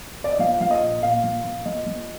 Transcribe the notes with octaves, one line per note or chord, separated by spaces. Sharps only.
D5
D#5
F3 F5
F3 F5
D#5
A#2
A#2 F5
F3
F3
F3 D#5
F3